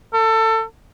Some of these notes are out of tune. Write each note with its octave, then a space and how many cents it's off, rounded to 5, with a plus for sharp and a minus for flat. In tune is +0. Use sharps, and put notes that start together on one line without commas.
A4 +25